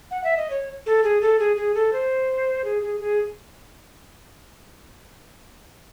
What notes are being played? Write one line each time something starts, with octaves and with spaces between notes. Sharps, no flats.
F#5
E5
D#5
C#5
A4
G#4
A4
G#4
G#4
A4
C5
G#4
G#4
G#4